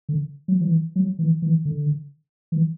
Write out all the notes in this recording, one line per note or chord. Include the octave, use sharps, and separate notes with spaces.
D3
F#3
E3
F#3
E3
E3
D3
E3